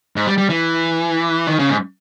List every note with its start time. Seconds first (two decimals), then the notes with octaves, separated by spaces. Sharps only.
0.16 G#2
0.27 G3
0.38 G3
0.49 E3
1.47 D#3
1.59 C#3
1.69 G#2